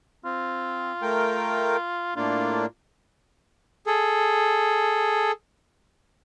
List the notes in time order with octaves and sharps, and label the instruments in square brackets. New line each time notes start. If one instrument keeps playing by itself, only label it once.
[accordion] C4 [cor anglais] F4
[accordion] A3 A#4 G5
[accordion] A2 A#3 D4 [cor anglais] F4
[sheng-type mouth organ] G#4 A4